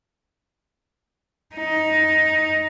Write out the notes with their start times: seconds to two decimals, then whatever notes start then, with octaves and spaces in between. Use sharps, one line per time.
1.56 D#4